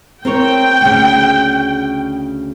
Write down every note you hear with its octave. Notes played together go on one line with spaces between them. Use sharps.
C4 A#4 C#5 G5
D2 C#3